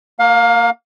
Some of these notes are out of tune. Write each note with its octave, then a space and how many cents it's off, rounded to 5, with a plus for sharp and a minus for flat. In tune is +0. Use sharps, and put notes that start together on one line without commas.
A#3 -15 F5 +25